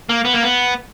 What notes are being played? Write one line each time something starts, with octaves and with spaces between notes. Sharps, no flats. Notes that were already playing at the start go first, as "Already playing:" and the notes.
A#3
B3
A#3
B3